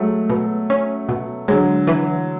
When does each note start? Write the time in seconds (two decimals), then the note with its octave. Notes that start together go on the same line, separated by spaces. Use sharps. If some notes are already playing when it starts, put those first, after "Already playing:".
Already playing: F#3 G#3 A3
0.30 B2
0.70 C#4
1.09 B2
1.48 D3 F#3 G#3
1.87 E3